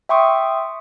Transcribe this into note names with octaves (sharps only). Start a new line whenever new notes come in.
E5 G5 C6 C#6 D#6